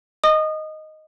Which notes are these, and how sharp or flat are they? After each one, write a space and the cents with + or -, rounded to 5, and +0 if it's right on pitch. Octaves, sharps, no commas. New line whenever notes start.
D#5 +0 D#6 -25